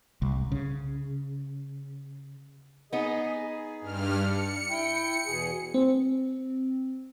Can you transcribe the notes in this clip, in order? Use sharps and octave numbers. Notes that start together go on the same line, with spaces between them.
C2
C#3
B3 D#4 G#4 D#5
G#4
G2 F6
D4 C#7
E4 G5
E2 B2 G#4
C4